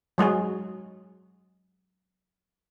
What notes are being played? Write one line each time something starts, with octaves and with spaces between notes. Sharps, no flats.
F#3 G#3 F#4 G#4